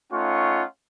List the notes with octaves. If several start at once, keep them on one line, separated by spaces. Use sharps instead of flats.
A3 C#4 D#4 F4 F#5 C#6